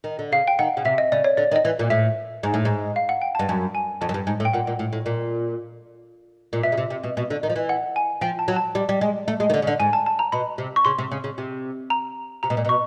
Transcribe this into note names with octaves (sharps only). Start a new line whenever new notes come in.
D#3
D3
C#3 F5
G5
D#3 F#5
C#3
C3 E5
D#5
C#3 D5
C#5
D3 D5
D#3
D#5
E3
A#2
A2 E5
G#2
A2
G#2
F5
F#5
G5
A5
G2
F#2 A5
G#5
F2 A5
F#2
G2
G#2
A2
G5
A#2 F#5
A#2
A2
A2
A#2
A#2
B2 E5
C#3
C3
C3
B2
B2
D3
D#3
F3
E3
F#5
G#5
F3 G5
A5
F#3
A5
G3
G3
G#3
A3
G#3
D#3
D3
C#3
D3
G#2 G#5
A5
A5
A#5
B2 B5
C3
C#6
C#3 C6
C3
C#3
C#3
C3
A#5
C3 A#5
B2
A#2
B2
C#6